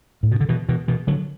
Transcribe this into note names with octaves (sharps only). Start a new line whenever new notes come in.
A2
B2
D3
B2 E3
B2 E3
B2 E3
D3 F#3